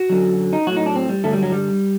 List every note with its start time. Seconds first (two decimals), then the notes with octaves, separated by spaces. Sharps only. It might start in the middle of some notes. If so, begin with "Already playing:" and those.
Already playing: F#4
0.10 F#2 D3 F#3
0.53 D#4
0.67 A2 F#3 F#4
0.76 D#4
0.86 D4
0.96 C4
1.09 G3
1.24 G2 D3 F#3 A3
1.33 G3
1.42 F#3
1.52 G3